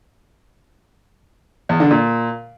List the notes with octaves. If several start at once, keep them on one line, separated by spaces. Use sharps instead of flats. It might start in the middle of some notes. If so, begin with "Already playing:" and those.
E2
D3
A#2